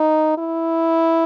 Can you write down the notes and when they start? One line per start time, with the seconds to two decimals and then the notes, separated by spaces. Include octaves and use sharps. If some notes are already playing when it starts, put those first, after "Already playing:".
Already playing: D#4
0.38 E4